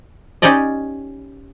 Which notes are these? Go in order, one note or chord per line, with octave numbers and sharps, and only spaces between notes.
C#4 D#4 G4 D5 D#5